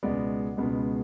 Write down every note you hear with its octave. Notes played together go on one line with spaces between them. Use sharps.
C#2 B2 G#3 B3 D5
C#2 B2 G#3 B3